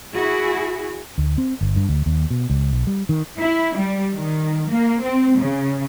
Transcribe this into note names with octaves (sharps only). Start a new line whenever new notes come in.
E4 F#4 G#4
D2
C4
G1
G2
D2
D#2
B2
C#2
B1
G3
D#3
E4
G3
D#3
A#3
C4
C#3